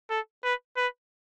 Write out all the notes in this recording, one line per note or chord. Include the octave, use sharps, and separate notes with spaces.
A4
B4
B4